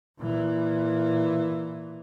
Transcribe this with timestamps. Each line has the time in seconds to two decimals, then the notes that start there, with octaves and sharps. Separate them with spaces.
0.19 A#2 E3